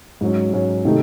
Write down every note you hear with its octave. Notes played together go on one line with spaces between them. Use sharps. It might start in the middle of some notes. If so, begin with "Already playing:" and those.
G#2 F#3 C#4
G#2 F#3 C#4
C3 D#3 A3 D#4